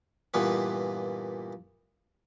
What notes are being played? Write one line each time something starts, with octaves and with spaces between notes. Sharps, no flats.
G2 A#2 E3 B3